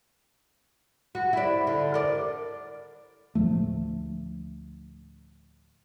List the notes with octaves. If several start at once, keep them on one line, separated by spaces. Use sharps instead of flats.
F#4
E4 D5
D3
A#4 D5
D2 A2 F3 A3